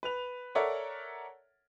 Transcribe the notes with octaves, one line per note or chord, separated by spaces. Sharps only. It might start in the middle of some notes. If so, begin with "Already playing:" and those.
B4 F7
A4 A#4 C#5 D5 E5 F#5